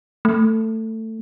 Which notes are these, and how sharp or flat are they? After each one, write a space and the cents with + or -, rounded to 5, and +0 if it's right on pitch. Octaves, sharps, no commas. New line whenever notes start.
A3 +15